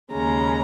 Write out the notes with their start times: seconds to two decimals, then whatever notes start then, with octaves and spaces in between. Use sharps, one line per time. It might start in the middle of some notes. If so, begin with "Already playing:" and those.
0.12 D#2 C#3 G#3 A#5